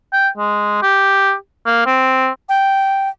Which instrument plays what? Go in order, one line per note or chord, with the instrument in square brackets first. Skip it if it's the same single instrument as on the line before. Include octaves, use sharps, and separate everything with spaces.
[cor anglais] G5
G#3
G4
A#3
C4
[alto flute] G5